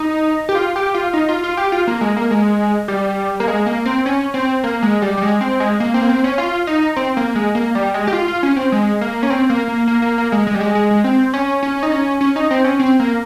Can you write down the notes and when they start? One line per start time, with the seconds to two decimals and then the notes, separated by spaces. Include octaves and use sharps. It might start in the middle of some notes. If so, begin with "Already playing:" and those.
Already playing: D#4
0.49 G4
0.55 F4
0.76 G4
0.94 F4
1.13 D#4
1.29 F4
1.44 F4
1.57 G4
1.72 F4
1.87 A#3
2.01 G#3
2.16 A#3
2.31 G#3
2.88 G3
3.40 A#3
3.48 G#3
3.66 A#3
3.85 C4
4.06 C#4
4.34 C4
4.64 A#3
4.82 G#3
5.02 G3
5.17 G3
5.22 G#3
5.41 C4
5.60 G#3
5.80 A#3
5.94 C4
6.02 A#3
6.09 C4
6.24 C#4
6.38 F4
6.67 D#4
6.96 C4
7.17 A#3
7.35 G#3
7.55 A#3
7.75 G3
7.94 G#3
8.07 G4
8.13 F4
8.28 F4
8.43 C#4
8.56 C4
8.72 G#3
9.01 A#3
9.23 C#4
9.30 C4
9.50 A#3
9.68 A#3
9.88 A#3
10.02 A#3
10.18 A#3
10.32 G#3
10.47 G#3
10.55 G3
10.61 G#3
10.75 G#3
10.91 G#3
11.04 C4
11.33 C#4
11.63 C#4
11.83 D#4
11.92 C#4
12.21 C#4
12.36 D#4
12.51 C4
12.64 C#4
12.79 C4
13.00 A#3